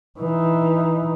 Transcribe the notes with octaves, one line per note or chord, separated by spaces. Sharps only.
E3 D#4